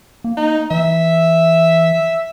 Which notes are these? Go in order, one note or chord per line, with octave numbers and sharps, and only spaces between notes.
A#3
D#4
E3 E5